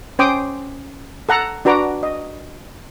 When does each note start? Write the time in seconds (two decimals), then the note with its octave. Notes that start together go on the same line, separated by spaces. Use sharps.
0.19 C#4 C5 G5 C6 D6 D#6
1.29 A4 F#5 A#5
1.65 D4 F#4 B4 A#5 D6
2.03 D#5